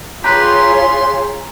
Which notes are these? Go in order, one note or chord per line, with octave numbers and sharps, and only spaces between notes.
F4 G4 G#4 B4 C#5 A#5 C6